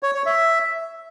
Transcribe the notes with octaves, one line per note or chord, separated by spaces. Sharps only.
C#5
C#5
E5